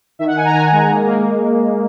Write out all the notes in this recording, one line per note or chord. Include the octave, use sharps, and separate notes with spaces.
D#3 E5
F#5
D#3 G#5
A#5
D#3 G#5
G#3
A#3
A#3